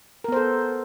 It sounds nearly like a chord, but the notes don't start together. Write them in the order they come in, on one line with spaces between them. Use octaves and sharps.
A#4 B3 C5 A4